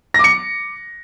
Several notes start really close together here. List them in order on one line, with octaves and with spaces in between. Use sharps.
A#6 D6 C#7